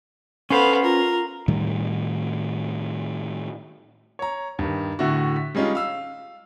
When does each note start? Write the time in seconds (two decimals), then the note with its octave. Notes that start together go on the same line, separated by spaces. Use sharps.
0.50 B3 C#4 A4 C5 F5
0.84 F4 A#4
1.48 A2 D#3 G3
4.19 C#5 A#5
4.59 G2 D#3
4.99 A2 D3 E4 F#4
5.36 B6
5.55 G3 G#3 C#4 D#4 F4
5.75 F5 E6